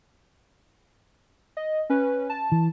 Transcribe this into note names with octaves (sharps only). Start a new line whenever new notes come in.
D#5
C#4 B4
A5
E3